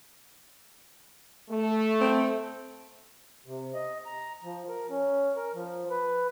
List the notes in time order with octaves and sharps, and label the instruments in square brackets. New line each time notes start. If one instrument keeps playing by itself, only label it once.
[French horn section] A3
[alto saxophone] C4
[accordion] C3
D#5
A#5
F3
A#4
C#4
A#4
F3
B4